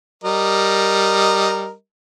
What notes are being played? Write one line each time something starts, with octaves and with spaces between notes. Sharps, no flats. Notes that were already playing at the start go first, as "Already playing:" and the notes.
G3 A#4 D#5